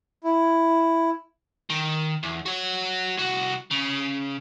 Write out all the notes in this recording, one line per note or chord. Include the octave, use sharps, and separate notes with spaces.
E4
D#3
E2
F#4 C#5
C2 F#4
C#3